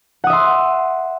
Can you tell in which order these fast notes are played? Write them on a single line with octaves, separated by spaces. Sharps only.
F#5 D#6 E5 C6